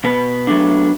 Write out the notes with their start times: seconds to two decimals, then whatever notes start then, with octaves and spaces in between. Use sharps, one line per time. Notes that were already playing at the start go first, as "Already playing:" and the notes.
0.04 B2 B3 B4
0.47 F#3 A3 D4